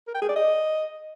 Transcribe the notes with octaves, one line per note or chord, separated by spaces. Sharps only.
A#4
G5
G#4
D5
D#5